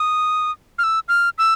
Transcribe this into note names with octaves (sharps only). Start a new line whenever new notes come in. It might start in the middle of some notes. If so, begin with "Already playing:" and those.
Already playing: D#6
F6
E6
F6
E6